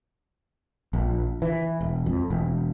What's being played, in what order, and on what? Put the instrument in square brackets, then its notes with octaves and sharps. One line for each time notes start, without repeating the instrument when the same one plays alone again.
[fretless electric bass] A#1
E3
E1
F2
E1